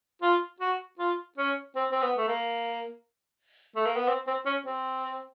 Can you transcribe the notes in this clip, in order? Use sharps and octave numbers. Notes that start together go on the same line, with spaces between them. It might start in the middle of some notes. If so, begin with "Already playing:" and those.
F4
F#4
F4
C#4
C4
C4
B3
A3
A#3
A3
A#3
B3
C4
C4
C#4
C4